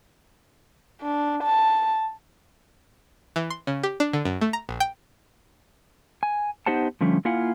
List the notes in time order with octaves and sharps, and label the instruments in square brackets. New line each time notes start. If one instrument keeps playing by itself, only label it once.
[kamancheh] D4
A5
[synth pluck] E3
C6
C#3
G4
D4
D3
F#2
A3
A#5
A#1
G5
[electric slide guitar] G#5
B3 D#4 G4 C5 F#5 A5
D3 F3 G3 A3 C#4
A#3 E4 F4 F5 F#5 G#5